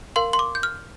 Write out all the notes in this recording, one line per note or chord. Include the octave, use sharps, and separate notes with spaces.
A#4 F5 C6
C6
D6
G6
F6